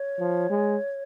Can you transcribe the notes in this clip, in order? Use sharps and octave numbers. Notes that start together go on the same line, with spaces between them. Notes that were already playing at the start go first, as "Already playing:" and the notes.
Already playing: C#5
F3
G#3